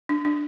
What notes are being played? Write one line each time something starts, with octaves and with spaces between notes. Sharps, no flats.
D4
D4